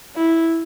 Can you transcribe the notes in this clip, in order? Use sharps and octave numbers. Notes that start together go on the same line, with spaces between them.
E4